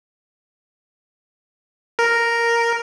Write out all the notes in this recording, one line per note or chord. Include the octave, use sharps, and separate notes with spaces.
A#4